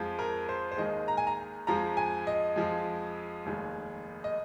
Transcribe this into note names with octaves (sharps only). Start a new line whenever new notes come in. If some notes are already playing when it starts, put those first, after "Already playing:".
Already playing: F2 F3 G#3
A#4
C5
C5
D#2 D#3 G#3 D#5
A#5
G#5
A#5
F2 F3 G#3 A#5
G#5
D#5
F2 F3 G#3
F1 D#2 D#3 G#3
D#5